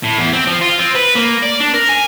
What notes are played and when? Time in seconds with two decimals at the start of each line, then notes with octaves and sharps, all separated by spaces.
0.03 A2
0.18 E2
0.33 C4
0.47 F3
0.61 F4
0.79 C4
0.95 B4
1.15 A#3
1.43 D5
1.60 D4
1.74 A#4
1.89 G#5